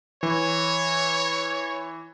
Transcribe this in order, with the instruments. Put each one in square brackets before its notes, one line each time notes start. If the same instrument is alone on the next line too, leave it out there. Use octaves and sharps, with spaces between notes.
[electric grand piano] E3 [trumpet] C#5